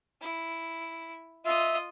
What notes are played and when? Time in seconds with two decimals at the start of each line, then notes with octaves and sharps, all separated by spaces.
0.21 E4
1.45 F4 D#5 E5